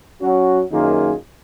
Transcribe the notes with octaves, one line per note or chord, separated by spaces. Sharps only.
F#3 C#4 F#4
F#2 D#3 A#3 F4 G#4